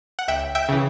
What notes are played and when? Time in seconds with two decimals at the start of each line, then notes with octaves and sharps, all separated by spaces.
0.19 F#5
0.28 C#2 E5 G5
0.55 E5 G5
0.69 C#3 E3